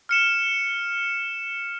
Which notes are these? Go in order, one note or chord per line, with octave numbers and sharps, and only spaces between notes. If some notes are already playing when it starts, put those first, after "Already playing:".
F6 C#7 E7